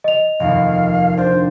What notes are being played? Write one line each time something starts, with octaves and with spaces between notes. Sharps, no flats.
D#5 F7
F1 D#2 F5
D4 G4 C5